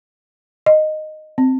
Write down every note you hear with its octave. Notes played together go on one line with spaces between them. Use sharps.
D#5
C4